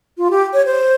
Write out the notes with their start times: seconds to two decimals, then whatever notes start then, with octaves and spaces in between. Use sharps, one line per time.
0.18 F4
0.31 G4
0.53 C#5
0.66 C5